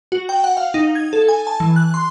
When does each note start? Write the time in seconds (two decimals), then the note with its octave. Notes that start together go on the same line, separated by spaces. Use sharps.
0.12 F#4
0.29 G5
0.44 F#5
0.57 F5
0.74 D#4
0.95 G#6
1.13 A4
1.29 G#5
1.47 A5
1.60 E3
1.76 F#6
1.94 C6